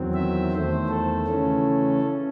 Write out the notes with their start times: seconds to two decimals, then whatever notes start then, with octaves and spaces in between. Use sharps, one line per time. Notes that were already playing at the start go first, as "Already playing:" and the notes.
Already playing: E2 D#3 F#3 C4
0.14 E5
0.52 E2 D#3 A3 C5
0.89 A4
1.27 C#3 E3 A3 C#4
2.01 C#4